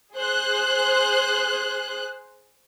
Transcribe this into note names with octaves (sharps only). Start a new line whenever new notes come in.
G#4 C5 F#6